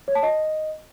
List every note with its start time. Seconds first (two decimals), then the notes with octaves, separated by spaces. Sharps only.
0.08 C#5
0.15 A5
0.23 D#5